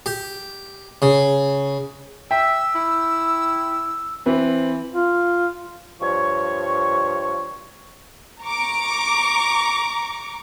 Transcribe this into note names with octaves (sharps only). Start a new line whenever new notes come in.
G4
C#3
E5 G5 E6
E4
E3 C4 B4
F4
G2 F3 C#5 C#6
A#5 C#6 D6